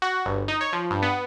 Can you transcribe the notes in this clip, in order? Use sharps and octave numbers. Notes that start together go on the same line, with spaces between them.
F#4
G1
D#4
C#5
F3
G2
B3